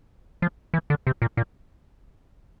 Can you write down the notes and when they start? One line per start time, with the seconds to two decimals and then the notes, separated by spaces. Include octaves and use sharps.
0.42 F3
0.74 E3
0.90 D3
1.07 C3
1.22 A#2
1.37 A#2